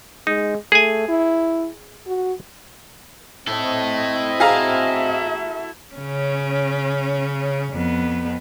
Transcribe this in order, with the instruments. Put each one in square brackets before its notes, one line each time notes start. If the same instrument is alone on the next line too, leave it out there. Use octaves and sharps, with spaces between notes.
[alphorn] G#3 [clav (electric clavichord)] D#4
[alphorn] A3 [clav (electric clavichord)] G#4 G#5
[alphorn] E4
F#4
[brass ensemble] C4 D#5 [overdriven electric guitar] E4 A4
[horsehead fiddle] F#4 E5 [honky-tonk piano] G#4 F5 A#5
[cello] C#3 C#4
F2 B3